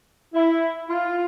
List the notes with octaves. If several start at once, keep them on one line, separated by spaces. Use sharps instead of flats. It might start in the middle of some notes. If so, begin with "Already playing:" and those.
E4
F4